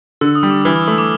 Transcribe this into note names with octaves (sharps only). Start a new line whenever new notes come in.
D3 E6
D#6
G3
D6
E3 F6
F6
A3 E6
D6